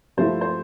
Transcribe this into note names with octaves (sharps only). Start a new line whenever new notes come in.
G2 F3 A3 E4 C5
C5